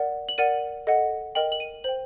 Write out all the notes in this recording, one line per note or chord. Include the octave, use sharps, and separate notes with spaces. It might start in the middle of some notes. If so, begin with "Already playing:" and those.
Already playing: A#4 D5 F#5
F#7
A#4 D5 F#5 D#7
A4 D#5 F#5
A#4 D#5 G5 F#7
F#7
D#7
C5 G5 F#7